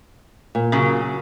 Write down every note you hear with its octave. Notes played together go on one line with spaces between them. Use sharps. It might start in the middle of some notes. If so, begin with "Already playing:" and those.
A#2
C#3 F#3